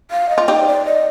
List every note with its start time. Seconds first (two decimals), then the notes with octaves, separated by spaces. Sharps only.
0.11 F5
0.29 D#5
0.38 F4
0.48 D#4 G4 D5
0.61 C5
0.67 D5
0.85 D#5